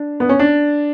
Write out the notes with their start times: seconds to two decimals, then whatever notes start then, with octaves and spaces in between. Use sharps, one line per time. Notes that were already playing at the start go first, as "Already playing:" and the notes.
Already playing: D4
0.20 B3
0.29 C#4
0.39 D4